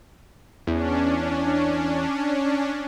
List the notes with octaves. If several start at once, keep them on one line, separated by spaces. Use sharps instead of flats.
E2 C#4 D4